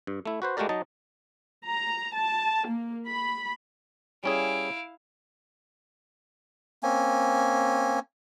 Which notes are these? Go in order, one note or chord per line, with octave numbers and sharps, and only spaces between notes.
G2
A3 E4
F#4 B4 C5
G#3 A3 F#4 G4 A#4 D5
F#3 D#4 D#5 A5
A#5
A5
A#3
B5
G3 C#4 E4 G#4 F5 D7
A#3 C4 C#4 G#5